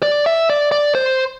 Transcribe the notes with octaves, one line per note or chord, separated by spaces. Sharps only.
D5
E5
D5
D5
C5